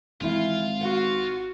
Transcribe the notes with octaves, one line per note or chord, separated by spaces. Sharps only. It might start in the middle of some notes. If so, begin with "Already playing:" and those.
G#1 E3 E4 F4
F#4 B4 F5